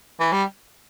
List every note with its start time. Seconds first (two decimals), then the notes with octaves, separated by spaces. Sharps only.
0.20 E3
0.32 G3